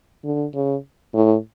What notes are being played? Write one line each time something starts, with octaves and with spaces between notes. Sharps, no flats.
D3
C#3
A2